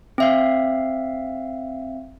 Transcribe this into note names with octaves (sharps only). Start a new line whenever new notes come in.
C4 E5 F5